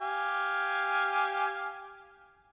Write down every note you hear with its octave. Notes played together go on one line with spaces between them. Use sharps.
G4 F5 G#5